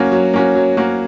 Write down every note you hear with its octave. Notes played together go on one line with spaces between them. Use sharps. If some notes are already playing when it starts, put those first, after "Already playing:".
Already playing: F#3 A#3 C#4 F#4
F#3
A#3 C#4 F#4
F#3
A#3 C#4 F#4